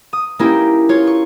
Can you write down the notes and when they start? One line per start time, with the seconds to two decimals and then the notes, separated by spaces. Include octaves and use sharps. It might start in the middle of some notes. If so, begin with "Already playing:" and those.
0.13 D#6
0.39 A#3 C#4 D#4 E4 G4
0.89 F4 C#5
1.07 C#6